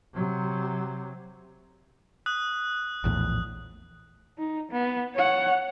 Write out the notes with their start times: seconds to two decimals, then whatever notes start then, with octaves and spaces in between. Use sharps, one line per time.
0.14 C3 F#3
2.26 D#6 F#6
3.04 A#1 E2 A2
4.38 D#4
4.71 B3
5.15 C#5 F#5